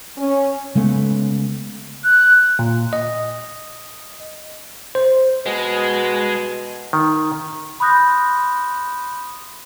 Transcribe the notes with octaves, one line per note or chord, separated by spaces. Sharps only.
C#4
C#3 G#3 A3 B3
F#6
A#2
D#5
C5
B2 G#3
D#3
B5 C6 D#6 F#6 G6 A#6